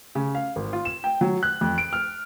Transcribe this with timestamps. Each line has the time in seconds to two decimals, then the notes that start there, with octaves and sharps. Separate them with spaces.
0.15 C#3
0.35 F5
0.56 G#1
0.73 F4
0.85 E7
1.04 G5
1.21 F#3
1.43 F#6
1.61 F2
1.78 D7
1.93 F6